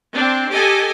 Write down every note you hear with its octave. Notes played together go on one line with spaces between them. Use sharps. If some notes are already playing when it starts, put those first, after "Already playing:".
C4 D4
G4 A4 D#5 G#5